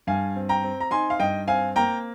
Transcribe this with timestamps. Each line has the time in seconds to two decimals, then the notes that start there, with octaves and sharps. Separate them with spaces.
0.07 G2 F5 G#5
0.36 C4
0.49 G5 A#5
0.64 C4
0.80 A#5
0.91 D#4 G#5 C6
1.10 F5
1.19 G2 D#5 G5
1.48 C4 F5 G#5
1.76 A#3 G5 A#5